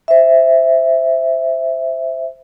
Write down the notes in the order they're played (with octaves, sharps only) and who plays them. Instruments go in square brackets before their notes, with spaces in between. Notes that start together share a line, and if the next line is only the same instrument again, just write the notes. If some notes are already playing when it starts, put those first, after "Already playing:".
[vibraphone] C5 E5